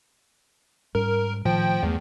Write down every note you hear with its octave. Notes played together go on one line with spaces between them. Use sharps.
G#2 G3 C#4 A#4
A2 D#3 F3 G5
E2 G2 A3